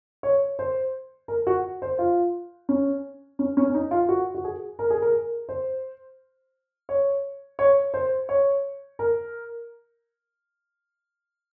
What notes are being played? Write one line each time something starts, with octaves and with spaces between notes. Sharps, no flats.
C#5
C5
A#4
F#4
C5
F4
C#4
C#4
C#4
C#4
D#4
F4
F#4
F#4
G#4
A#4
G#4
A#4
C5
C#5
C#5
C5
C#5
A#4